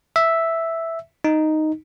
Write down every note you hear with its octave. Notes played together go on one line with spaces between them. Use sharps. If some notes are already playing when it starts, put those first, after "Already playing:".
E5
D#4